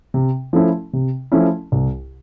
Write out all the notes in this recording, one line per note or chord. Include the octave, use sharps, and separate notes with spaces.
C3
F3 A3 C#4 E4
C3
F3 A3 C#4 E4
C2